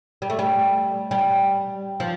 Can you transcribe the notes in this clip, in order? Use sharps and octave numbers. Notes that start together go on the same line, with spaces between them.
G3
A3
G3
G3
F3